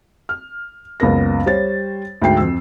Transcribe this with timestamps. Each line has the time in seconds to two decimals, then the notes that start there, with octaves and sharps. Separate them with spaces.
0.29 F6
1.00 F#1 C#2 B3 A#4 A#6
1.46 G3 C5 C#5 A6
2.22 D2 G#2 G5 C7
2.37 F2 E6